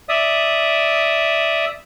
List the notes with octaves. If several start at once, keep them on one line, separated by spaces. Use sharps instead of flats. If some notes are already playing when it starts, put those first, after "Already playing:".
D5 E5 D#6